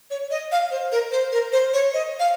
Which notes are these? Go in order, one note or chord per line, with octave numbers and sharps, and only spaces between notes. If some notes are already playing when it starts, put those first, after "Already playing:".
C#5
D#5
F5
C5
A#4
C5
A#4
C5
C#5
D#5
F5